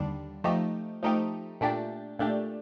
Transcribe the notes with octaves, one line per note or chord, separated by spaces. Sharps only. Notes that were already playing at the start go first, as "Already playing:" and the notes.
Already playing: D#2 D3 G3 D4
F3 A3 D#4 G4
F3 A3 D#4 G4
A#2 A3 D4 G4
A#2 A3 D4 G4